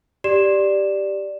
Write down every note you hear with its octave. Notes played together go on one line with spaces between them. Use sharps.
G4 D5 E7